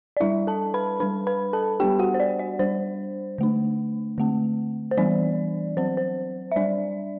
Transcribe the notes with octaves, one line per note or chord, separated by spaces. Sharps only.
D5
G3 D4 E4 E5
A4 A5
B4 B5
G3 D4 B4 B5
B4 B5
A4 A5
G3 B3 D4 G4 G5
F#4 F#5
C5
D5
D5
G3 D4 C5
D3 A3 D4
D3 A3 C4
C5
E3 G3 B3 D4 D5
F#3 C4 C5
C5
E5
G3 D4 D5